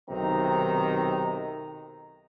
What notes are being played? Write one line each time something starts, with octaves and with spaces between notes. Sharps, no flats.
B1 C3 D#3 D#4 A#5